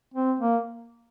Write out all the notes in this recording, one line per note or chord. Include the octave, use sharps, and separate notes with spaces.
C4
A#3